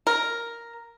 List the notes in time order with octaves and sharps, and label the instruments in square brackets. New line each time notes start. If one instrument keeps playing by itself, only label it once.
[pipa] A#4